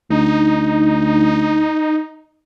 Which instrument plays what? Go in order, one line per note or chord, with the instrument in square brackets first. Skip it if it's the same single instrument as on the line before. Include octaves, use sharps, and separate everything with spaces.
[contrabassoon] D2 [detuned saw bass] D#4